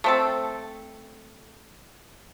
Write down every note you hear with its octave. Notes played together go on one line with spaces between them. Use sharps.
A3 C4 A4